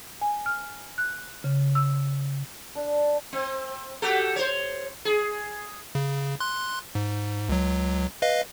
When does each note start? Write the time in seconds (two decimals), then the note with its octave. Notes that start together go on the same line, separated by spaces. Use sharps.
0.21 G#5
0.46 F6
0.98 F#6
1.44 C#3
1.75 E6
2.75 D4
3.33 C4
4.02 F#4 G4 A4
4.36 C5 C#5
5.05 G#4
5.95 C#3
6.40 C6 F#6
6.95 G#2
7.49 C#2 F#3
8.22 B4 D#5 F5